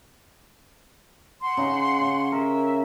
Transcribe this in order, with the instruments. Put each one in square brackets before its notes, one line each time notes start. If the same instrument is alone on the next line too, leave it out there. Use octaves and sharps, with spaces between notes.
[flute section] F#5 C6
[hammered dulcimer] C#3 D#4
C#3
[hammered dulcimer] A#4 [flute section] E5